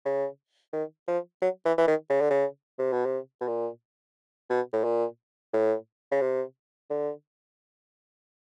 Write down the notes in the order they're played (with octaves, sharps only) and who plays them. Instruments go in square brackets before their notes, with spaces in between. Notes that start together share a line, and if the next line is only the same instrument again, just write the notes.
[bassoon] C#3
D#3
F3
F#3
E3
E3
D#3
C#3
D3
C#3
C3
B2
C3
B2
A#2
B2
A2
A#2
A2
C#3
C3
D3